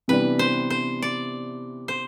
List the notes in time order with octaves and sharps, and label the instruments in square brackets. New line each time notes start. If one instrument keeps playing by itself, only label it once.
[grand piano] C3 E3 G3 B3 D4 [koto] B4
[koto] C5
C5
D5
C5